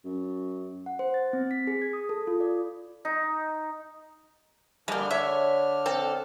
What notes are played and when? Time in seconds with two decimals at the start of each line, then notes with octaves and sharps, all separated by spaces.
0.04 F#2
0.86 F#5
0.99 C5
1.14 A6
1.33 C4
1.51 B6
1.67 G#4
1.82 G#6
1.93 D#6
2.09 A4
2.27 F4
2.41 D5
3.05 D#4
4.88 D3 G3 G#3 A#3 D4 F6
5.11 C#5 E5
5.86 C4 A4